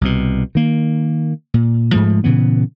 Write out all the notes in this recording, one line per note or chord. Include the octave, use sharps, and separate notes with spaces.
C2 B2
D#3 A#3
A#2
G#2 F3 G#3 A3
A#2 C#3 E3 B3